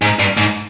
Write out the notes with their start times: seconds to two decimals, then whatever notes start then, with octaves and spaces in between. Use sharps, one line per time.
0.02 G#2
0.19 G2
0.37 G#2